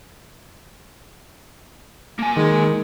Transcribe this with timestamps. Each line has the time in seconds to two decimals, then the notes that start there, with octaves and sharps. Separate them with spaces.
2.19 A#3 G#5
2.37 D#3 G#3